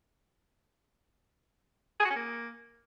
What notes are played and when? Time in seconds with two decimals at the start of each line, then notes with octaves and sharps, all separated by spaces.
2.00 G#4
2.05 F#4
2.10 C#4
2.16 A#3